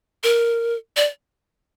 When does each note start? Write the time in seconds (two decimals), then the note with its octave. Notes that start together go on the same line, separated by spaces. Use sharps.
0.24 A#4
0.97 D5